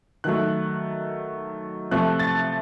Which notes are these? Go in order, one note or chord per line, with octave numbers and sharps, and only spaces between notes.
D#3 F#3 A3 F#6
C3 F3 A3 F#6
A6